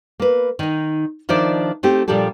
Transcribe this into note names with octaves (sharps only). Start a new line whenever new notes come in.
A#3 B4
D#3 D#4
D#3 F3 D4 C5 D5 E5
A3 C4 D#4 G4
A#2 F3 G3 D4 G4 A4